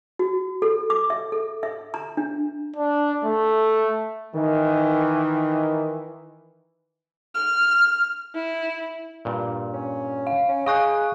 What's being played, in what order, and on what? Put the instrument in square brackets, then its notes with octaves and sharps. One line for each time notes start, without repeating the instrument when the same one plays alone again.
[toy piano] F#4
A4
D6
E5
A4
E5
A#5
D4
[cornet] D4
A3
[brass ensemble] D#3 E3
[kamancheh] F6
E4
[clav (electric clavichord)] G2 A#2
[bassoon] C#4
[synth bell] F5
[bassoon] C#4
[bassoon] G#4 [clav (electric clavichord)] D#5 [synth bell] F5 C#6 F#6